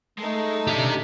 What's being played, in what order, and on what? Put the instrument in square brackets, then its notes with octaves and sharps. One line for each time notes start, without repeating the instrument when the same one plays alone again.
[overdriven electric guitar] G#3 [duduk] A3 [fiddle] D#4 A4
[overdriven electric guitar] C#3 D4 [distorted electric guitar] G4 E5